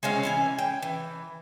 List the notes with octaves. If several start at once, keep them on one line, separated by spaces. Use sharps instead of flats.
G#3 C4 C#4 F5
E3 C#4 G#5
G5
E3